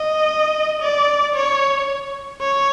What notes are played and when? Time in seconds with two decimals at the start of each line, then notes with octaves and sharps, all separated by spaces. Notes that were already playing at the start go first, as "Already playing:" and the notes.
Already playing: D#5
0.82 D5
1.35 C#5
2.41 C#5